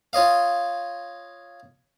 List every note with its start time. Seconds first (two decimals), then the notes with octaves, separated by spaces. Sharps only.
0.13 F4 C#5 D#5 F5